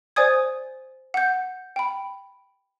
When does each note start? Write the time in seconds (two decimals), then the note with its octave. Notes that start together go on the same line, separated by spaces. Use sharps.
0.16 C5 D5 G#5 D#6 G#6
1.14 F#5 G6
1.76 G5 B5